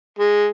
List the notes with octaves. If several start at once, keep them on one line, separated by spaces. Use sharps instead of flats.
G#3